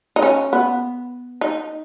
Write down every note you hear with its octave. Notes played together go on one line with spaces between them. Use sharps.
D#4
C#4
B3
D#4